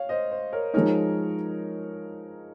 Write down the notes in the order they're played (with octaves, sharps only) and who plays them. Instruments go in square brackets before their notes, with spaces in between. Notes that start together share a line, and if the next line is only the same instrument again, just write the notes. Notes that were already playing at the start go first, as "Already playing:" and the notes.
Already playing: [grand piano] C#5 F5
C5 D#5
C5
A#4 C#5
[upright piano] F3 G#3 D#4 [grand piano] A#4 C#5